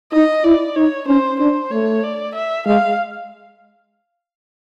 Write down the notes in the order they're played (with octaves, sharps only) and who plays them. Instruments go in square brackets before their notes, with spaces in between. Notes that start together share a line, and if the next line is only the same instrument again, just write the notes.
[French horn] D#4 [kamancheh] D#5
[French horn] E4 [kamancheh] D5
[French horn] D#4 [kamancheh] C#5
[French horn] C#4 [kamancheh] C5
[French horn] D4 [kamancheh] C5
[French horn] A3 [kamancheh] C#5
[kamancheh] D5
E5
[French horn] G#3 [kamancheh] F5